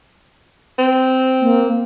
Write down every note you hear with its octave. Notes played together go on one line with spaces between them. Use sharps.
C4
A#3